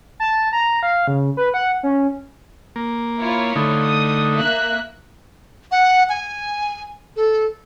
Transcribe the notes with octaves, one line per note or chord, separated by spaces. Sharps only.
A5
A#5
F5
C#3
B4
F#5
C#4
A#3
E4 F4 C#5
D3 A3 D#4
D#6
A#3 E5 F#6
F#5
G#5
A4